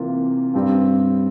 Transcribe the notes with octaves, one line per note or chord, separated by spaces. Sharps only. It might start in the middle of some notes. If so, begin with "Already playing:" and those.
Already playing: C3 E3 A#3 F4
G2 G3 C4 G4